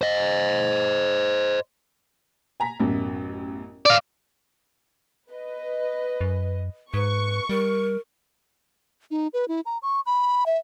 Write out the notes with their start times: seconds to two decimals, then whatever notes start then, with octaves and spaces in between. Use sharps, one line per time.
0.02 C5 D#5
2.60 G#5 A#5 B6
2.80 A1 F#2 B2
3.86 D5 F5
5.31 B4 D#5
6.21 F#2
6.94 G#2 B4 C#6
7.49 G3 A#4
9.11 D#4
9.33 B4
9.48 E4
9.66 A#5
9.83 C#6
10.06 B5
10.46 E5